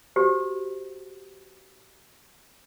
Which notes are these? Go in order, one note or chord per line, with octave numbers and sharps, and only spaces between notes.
F#4 G4 C5